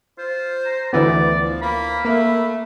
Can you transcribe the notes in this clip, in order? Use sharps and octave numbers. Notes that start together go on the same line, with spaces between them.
F4 C5
A#5
D2 E3 B3 D5
F3
A#3 B5
A3 A#3